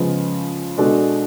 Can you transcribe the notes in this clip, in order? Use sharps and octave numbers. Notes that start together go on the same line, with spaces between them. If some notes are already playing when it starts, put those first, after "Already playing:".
Already playing: C#3 F3 G#3 B3 F4
B2 G#3 D4 F#4 A4